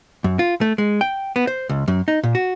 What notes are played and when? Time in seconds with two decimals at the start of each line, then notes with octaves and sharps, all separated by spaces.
0.24 F#2
0.39 F4
0.61 A3
0.78 G#3
1.01 G5
1.36 B3
1.47 C5
1.69 C#2
1.88 F#2
2.08 D#4
2.23 A#2
2.35 F#4